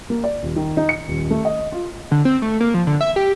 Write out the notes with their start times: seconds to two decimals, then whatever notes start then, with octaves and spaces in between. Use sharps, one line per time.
0.10 A#3
0.24 D5
0.43 D#1
0.56 D#3
0.77 D#4
0.89 C#7
1.08 D#1
1.31 A3
1.45 D#5
1.72 F4
2.11 D3
2.25 C4
2.42 A3
2.60 A#3
2.74 F3
2.87 D3
3.01 E5
3.16 G4